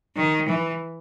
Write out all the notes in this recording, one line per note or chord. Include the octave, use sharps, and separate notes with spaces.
D#3
E3